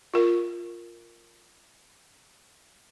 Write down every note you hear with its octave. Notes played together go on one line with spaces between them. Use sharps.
F4 A#4